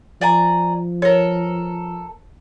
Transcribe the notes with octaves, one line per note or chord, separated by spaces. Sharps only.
F3 D5 G#5 A#5
A4 A#4 C#5